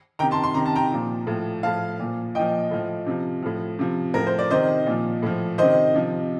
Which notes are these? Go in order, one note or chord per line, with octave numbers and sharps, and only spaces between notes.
C3 D#3 G5 A#5
A5 C6
C6
C3 D#3 A#5
A5
G5 A#5
A#2 F3
A2 F3
A2 F3 F5 A5
A#2 F3
A#2 F3 D#5 G5
A2 F3
C3 F3
A2 F3
C3 F3
A2 F3 A#4
C5
D5
C3 D#3 C5 D#5
A#2 F3
A2 F3
C3 D#3 C5 D#5
C3 F3